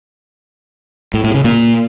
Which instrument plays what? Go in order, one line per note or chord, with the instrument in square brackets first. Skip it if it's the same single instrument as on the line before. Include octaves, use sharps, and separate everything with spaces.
[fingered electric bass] A2
A2
C#3
A#2